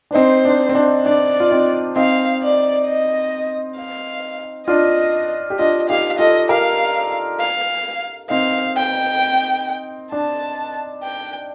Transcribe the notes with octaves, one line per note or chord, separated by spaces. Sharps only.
D4
C4 D#4 C5
D4
C4
D4
D4 D5
F4
C4 D#4
C4 D#4 F5
D5
D#5
F5
D4 F4 D#5
G4
D4 F4 D#5
D#4 G4 F5
F4 A4 D#5
G4 A#4 F5
F5
C4 D#4 F5
G5
D4 A5
G5